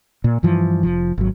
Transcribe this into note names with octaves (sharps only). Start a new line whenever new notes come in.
A#2
G2 E3 F3
F1 F3
G#1 F#3